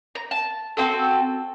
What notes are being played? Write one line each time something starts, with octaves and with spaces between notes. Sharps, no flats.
A#5
A5
C4 F#4 A4